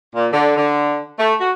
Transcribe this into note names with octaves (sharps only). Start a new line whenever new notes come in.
A#2
D3
D3
A3
F#4